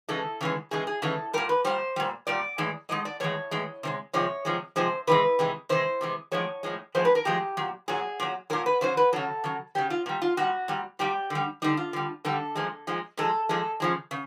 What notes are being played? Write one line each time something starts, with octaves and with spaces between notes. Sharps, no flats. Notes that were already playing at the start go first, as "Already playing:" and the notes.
C#3 E3 G#3 A4
C#3 E3 G#3
C#3 E3 G#3 G#4
G#4
C#3 E3 G#3 A4
A#2 G3 A#4
B4
A#2 G3 C5
A#2 G3
A#2 G3 D5
A2 E3 G#3
A2 E3 G#3 D#5
D5
A2 E3 G#3 C#5
A2 E3 G#3
C3 F3 G#3
C3 F3 G#3 C#5
C3 F3 G#3
C3 F3 G#3 C5
C3 E3 G#3 B4
C3 E3 G#3
C3 E3 G#3 C5
C3 E3 G#3
A2 F3 G#3 C#5
A2 F3 G#3
A2 F3 G#3 C5
B4
A#4
A2 F3 G#3 G4
A#2 F#3
A#2 F#3 G#4
A#2 F#3
A#2 F#3 A#4
B4
C#3 F#3 C5
B4
C#3 F#3 A4
C#3 F#3
C#3 F#3 G4
F4
A#2 G3
F4
A#2 G3 F#4
A#2 G3
A#2 G3 G4
D3 G3
D3 G3 D#4
F4
D3 G3
D3 G3 A4
A#2 F3 G#3
A#2 F3 G#3
A#2 F3 G#3 A4
A#2 F3 G#3 A4
C#3 F3 G#3
C#3